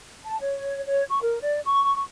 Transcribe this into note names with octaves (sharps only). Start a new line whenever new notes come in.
A5
C#5
C#5
C#6
A#4
D5
C#6